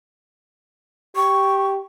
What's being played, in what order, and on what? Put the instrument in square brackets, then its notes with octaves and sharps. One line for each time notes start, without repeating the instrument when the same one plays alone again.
[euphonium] G4 [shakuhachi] C#6